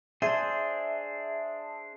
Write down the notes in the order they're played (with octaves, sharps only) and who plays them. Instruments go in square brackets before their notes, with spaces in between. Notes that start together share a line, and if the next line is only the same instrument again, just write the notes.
[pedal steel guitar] D4 G#4 C5 [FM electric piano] E5